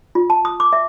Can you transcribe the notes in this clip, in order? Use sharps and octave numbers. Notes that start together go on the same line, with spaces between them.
F4
A5
D#6
D6
E5